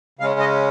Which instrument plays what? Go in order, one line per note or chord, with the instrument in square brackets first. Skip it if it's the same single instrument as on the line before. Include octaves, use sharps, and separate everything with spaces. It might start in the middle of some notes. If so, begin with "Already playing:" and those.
[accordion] C#3 G#3 C#4 F5
D#5